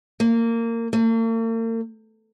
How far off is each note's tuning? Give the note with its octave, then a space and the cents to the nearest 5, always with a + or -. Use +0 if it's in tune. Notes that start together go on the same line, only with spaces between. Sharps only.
A#3 -20
A#3 -45